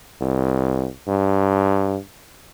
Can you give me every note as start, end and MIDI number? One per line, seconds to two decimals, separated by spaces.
0.21 0.88 36
1.07 1.97 43